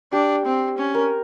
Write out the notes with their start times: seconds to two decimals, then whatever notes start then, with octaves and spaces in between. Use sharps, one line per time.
0.13 D4 G4
0.46 C4
0.78 C#4
0.95 A#4